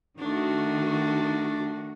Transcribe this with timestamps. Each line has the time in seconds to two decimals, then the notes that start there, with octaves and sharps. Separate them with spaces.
0.19 D#3 A3 D4 F#4